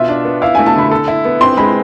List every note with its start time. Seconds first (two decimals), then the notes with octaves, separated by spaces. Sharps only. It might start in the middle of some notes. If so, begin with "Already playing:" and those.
Already playing: B2 F4 E5
0.08 D4
0.25 B3
0.42 E4 F5
0.55 A3 G#5
0.66 A5
0.76 D3 B5
0.91 A4
1.08 E4
1.25 B3
1.41 C4 C6
1.57 G#3 B5